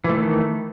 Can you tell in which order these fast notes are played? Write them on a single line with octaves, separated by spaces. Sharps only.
E3 A3 D#3